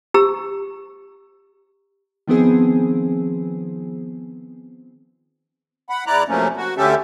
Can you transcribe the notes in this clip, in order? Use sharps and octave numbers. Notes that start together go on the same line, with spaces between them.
G4 A#5 E6
D#3 F3 B3 C4 G#4
F#5 B5
E2 E4 D5 A#5 F#6
C3 F3 F#3 A3 A#3 C#4
F#4
D2 D3 C#4 G4 A4 E5